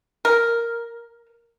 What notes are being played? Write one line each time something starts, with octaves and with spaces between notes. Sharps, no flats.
A#4